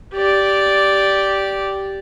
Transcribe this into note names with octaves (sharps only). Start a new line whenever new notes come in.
G4 D5